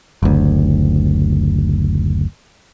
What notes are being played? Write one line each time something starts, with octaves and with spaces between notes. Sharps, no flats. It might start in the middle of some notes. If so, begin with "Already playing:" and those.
F#1 D2